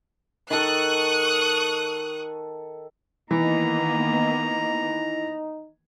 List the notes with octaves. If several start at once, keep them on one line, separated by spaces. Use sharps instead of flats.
D#3 A4 C#6 D#6 F#6
D#3 E3 A#3 B3 D#4 A#5